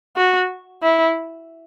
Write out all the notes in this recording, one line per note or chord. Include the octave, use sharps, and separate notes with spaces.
F#4
E4